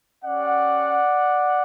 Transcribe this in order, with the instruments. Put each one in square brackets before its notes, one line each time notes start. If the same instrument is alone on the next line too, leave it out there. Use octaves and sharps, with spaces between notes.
[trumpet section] C#4 G4 D5 F#5